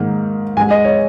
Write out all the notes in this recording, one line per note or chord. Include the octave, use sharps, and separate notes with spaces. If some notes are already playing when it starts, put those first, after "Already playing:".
Already playing: G#2 D#3 A#3
G#2 G#3 G#5
D#5
C#5